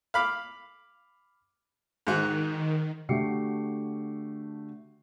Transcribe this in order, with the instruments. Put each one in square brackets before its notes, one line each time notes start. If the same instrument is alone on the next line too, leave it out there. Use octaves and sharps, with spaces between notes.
[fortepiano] F5 B5 D6
[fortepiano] G#2 F#4 [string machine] D#3
[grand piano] D3 A3 F#4 G4 C7 C#7